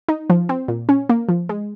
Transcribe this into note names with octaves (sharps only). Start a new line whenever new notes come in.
D#4
F3
C4
A#2
C#4
A#3
F3
G#3